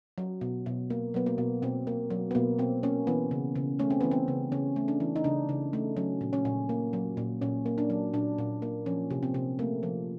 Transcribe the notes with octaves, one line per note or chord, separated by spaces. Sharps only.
F#3
B2
B2
A#3
F#3 B3
A#3
B2
B2 C4
A#3
F#3
B3
B2 A#3
B2 C4
A#3 C#4
E3 B3
C#3
C#3
A3 C#4
C4
E3 B3
C4
C#3
C#3 C#4
A3
D4
E3
D#4
C#3 D4
C#3
A3
F#3 C#4
A#2
C#4
A#2
A#3
F#3
A#2
A#2 C#4
A#3
D4
F#3
A#2 D4
A#2
A#3
F3 C#4
C3
C4
C3
A3 A#3
F3